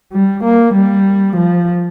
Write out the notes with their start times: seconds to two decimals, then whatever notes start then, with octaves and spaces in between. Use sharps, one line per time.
0.13 G3
0.44 A#3
0.75 G3
1.36 F3